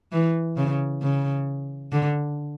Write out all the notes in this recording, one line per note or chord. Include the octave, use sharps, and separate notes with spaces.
E3
C#3
C#3
D3